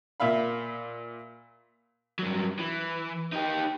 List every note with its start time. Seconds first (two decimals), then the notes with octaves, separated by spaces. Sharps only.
0.20 A#2 E5 F5 B5
2.19 G2 F#3
2.59 E3
3.33 D#4 G4